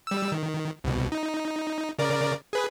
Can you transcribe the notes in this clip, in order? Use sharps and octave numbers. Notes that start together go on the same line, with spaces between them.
G3 E6
D#3
C2 B2
D#4
C#3 A#4 D5
G#4 B4